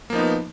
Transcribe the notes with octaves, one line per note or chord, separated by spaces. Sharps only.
F3 A#3 B3 D#4